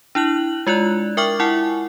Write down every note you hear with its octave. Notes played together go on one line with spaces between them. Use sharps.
D4 E4 F#6 F#7
G#3 F4 D5 F#6
A#4 E5 G5 C#6 D6 F6
E4 F#5 G#5